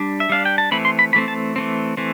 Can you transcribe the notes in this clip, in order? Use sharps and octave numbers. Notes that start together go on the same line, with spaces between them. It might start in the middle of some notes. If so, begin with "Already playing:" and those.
Already playing: G3 D4
E5
G3 D4 F5
G5
A5
E3 A3 C4 B5
C6
B5
E3 A3 C4 B5
A5
E3 A3 C4
E3 A3 C4